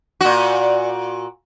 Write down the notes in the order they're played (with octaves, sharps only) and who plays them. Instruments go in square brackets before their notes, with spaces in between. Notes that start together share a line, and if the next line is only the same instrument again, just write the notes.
[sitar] A#2 F#4